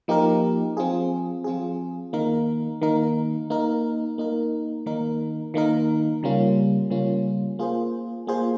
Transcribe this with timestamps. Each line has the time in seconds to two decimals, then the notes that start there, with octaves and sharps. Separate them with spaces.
0.08 F3 A#3 D#4 G4 A#4
0.77 F3 C4 F4 G#4
1.44 F3 C4 F4 G#4
2.13 D#3 A#3 D#4 A#4
2.82 D#3 A#3 D#4 A#4
3.50 A#3 D#4 A#4
4.18 A#3 D#4 A#4
4.86 D#3 A#3 D#4 A#4
5.54 D#3 A#3 D#4 A#4
6.23 C#3 G3 A#3 C#4 F4
6.90 C#3 G3 A#3 C#4 F4
7.59 A#3 F4 G#4 C5
8.27 A#3 F4 G#4 C5